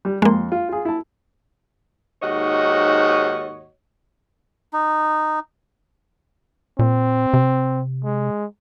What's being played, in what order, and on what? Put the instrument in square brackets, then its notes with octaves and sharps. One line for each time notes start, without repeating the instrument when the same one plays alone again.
[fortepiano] G3
[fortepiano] F2 C6 [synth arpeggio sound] G#3 A#3
[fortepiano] F4
F4 G#4
E4 A5
[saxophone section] D#2 G#2 F#4 C#5 D#5
[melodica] D#4
[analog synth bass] A#2 [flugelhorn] C4
[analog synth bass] C3
[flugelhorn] G#3